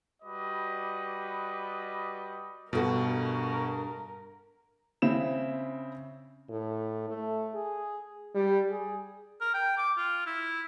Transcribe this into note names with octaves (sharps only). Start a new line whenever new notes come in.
G3 F#4 B4 D#5 D6
G2 B2 F#4 A4 A#4
C#3 C4 E4 E7
A2
A3
G#4
G3
G#4
A#4
G5
D6
F4
E4